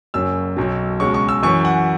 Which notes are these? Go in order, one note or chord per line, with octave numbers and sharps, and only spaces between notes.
F#1 F#2 F#3 C#4 E6
B1 B2 F#3
C#2 B2 G#3 C#4 C#6
C#6
E6
F#2 E3 C#4 C#6
F#5